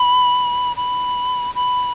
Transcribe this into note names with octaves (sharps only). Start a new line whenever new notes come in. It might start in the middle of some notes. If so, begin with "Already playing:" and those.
Already playing: B5
B5
B5